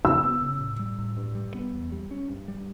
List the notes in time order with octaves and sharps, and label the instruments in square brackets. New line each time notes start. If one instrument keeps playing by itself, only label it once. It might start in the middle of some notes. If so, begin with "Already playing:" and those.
[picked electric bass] C#3 [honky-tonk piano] E6
[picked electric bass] B3
C#3
A2
G3
A2
G2
G3
B3
E2
G3
C#4
G2
G3